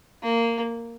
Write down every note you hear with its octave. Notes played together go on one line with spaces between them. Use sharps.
A#3